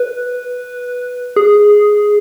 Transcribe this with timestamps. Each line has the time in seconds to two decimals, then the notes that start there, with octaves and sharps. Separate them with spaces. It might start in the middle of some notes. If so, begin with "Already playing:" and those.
Already playing: B4
1.36 G#4